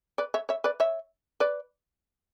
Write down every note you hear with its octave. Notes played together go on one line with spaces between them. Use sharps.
B4 D5
C#5 E5
C#5 E5
B4 D5
C#5 E5
B4 D5